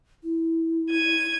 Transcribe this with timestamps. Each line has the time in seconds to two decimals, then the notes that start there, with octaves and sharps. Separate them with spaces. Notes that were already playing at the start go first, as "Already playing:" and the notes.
0.23 E4
0.91 G#6 D#7